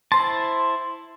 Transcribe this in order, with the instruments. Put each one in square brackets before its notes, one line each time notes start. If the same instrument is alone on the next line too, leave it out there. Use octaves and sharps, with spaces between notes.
[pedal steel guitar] E4 C5 A5 [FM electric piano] C6